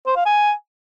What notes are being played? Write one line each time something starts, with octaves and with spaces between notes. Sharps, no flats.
C5
F5
G#5